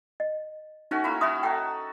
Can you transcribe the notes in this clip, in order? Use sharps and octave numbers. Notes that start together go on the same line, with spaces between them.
D#5
A3 C#4 D#4 F#4
A#3 E4
E4 F#4 E5 C6 D#6
D#4 A4 G5